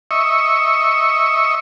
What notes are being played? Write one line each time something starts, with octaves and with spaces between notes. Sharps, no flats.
D#5 E5 C#6